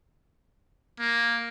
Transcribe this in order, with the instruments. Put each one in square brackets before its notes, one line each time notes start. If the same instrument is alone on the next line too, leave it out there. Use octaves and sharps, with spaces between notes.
[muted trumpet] A#3